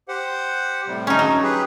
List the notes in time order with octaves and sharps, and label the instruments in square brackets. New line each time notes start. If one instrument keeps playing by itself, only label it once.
[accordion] G4 C5 F#5
A2 C3 G3
[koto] C#4 D#4
[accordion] G2 [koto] F#3
[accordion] G4 G#4 B4